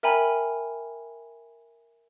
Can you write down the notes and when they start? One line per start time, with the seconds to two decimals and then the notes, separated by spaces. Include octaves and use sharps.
0.03 A#4 E5 G5 G#5 A#5 B5